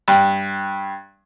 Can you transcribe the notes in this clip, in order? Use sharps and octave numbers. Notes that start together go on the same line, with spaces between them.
G2